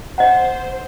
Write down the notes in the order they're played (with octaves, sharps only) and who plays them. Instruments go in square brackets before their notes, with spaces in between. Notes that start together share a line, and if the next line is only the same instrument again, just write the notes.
[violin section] C5 [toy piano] D#5 F#5